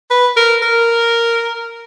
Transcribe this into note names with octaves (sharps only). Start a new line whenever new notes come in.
B4
A#4
A#4